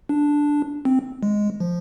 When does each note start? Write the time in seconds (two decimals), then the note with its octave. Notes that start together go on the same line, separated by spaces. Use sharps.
0.09 D4
0.85 C4
1.23 G#3
1.60 F3